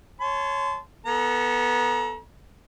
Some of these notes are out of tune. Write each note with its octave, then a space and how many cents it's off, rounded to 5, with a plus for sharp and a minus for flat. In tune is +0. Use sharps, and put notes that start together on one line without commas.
C#5 +0 A5 -30 C6 -25
B3 -10 A4 +0 A#5 +35